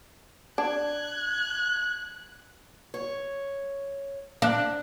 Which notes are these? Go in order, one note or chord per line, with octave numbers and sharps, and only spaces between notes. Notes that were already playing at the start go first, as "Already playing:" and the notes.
D4 F#6 G#6
C#5
D4 F5 F#6